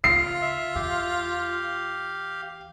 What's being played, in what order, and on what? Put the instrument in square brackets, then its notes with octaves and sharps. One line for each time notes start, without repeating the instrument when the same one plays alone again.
[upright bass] C#3 [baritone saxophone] F4 [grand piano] C7
[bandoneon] E5
[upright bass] E2 [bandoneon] G4 F5